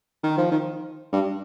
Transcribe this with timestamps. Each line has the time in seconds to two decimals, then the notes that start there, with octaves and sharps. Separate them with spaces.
0.23 D#3
0.38 F3
0.51 D#3
1.12 G2